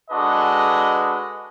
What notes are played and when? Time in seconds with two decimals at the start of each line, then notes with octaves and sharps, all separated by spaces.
0.11 G#3 D4 F#4 A4 B4 D#5